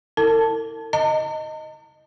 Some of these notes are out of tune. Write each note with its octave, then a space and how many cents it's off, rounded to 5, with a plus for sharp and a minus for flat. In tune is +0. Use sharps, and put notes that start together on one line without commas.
E4 -25 A#4 -45 A5 +0
D#5 +0 A#5 -45